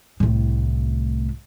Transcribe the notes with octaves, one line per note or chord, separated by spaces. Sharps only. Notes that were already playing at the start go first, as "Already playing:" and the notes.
C2 A2